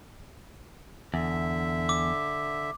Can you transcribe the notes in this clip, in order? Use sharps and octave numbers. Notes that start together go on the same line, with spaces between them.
E2 D3 E5
D6